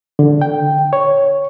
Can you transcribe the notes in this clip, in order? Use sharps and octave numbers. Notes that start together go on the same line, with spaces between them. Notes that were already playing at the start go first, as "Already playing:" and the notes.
D3
G5
C#5